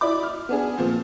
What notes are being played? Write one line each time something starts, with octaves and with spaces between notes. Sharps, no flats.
E4 D5 D#5 B5 D6
F6
B3 D4 G#4
A#2 F3 C4